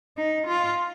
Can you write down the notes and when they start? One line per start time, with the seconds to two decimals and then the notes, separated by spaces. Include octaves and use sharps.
0.17 D#4
0.47 F4